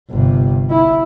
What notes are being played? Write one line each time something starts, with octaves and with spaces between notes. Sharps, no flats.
G1 C3
E4